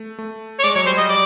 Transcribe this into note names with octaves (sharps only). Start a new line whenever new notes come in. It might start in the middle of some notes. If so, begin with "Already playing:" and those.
Already playing: A3
A3
C#5
G#3 D5
F#3 C#5
G3 C5
G3 D#5
D5